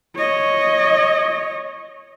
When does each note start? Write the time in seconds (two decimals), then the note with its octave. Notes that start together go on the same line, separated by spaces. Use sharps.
0.17 C#5 D#5